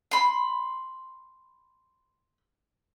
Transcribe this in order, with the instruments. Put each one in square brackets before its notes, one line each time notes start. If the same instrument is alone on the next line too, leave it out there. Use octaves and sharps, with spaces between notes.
[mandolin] B5 C6